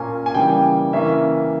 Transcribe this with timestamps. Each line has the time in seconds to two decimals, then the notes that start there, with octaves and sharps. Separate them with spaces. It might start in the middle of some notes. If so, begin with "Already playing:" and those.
Already playing: A#2 A#3 C#4 G#5
0.26 G#5
0.34 C#3 E3 G3 A#3 G5
0.93 C#3 E3 A#3 C#4 E5